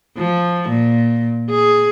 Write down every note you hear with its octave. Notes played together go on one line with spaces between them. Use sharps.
F3
A#2
G#4